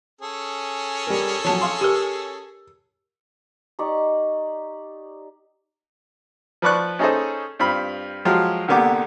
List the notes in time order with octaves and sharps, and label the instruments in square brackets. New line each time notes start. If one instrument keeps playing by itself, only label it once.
[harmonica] C#4 G#4 A4
[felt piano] G3 A#4
[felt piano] F3 F#3 [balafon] C#5 A5
[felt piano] F5 C6
[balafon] G4 A#4 [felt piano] E6
[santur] D#4 G4 D5 C#6
[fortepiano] F3 B4 D5 C#6 F#6
C#4 D#4 G#4 A4 C5 D#5
G2 C4 F4 B5
F3 F#3 G#3 F4 G4
C2 D3 A#3 B3 G4 D6